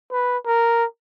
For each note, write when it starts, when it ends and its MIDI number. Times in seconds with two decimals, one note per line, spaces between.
0.12 0.38 71
0.46 0.85 70